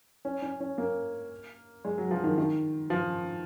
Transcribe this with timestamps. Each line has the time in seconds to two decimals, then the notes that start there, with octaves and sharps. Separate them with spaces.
0.25 C#4
0.42 C#4
0.60 C#4
0.78 A#3
1.85 G#3
1.98 F#3
2.11 F3
2.24 D#3
2.38 D#3
2.90 F3